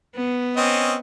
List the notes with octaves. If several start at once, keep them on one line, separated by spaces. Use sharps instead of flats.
B3
C4 C#4 D#5